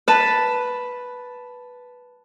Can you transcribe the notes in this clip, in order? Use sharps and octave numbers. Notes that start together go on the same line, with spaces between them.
B4 A5